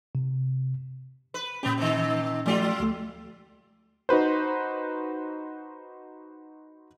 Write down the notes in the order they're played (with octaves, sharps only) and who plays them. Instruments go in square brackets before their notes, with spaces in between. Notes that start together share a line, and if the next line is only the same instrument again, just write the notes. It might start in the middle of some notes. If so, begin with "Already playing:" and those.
[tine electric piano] C3
[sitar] B4
[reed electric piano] A#2 C#4 [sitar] B3 G4
[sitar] C3 D#3
[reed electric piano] F3 A3 D5 [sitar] F#3 F4
[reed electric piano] D2 A3
[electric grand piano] D#4 F#4 B4 C5